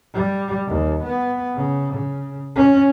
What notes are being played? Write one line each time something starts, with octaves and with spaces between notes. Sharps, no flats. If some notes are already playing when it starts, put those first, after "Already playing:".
G3
D#2
B3
C#3
C#3
C#4